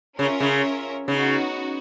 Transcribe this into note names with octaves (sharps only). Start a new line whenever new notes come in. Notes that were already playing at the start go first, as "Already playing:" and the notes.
C#3 C#4 F4 A#4 C#5 E5
C#3
C#3 B3 D#4 F#4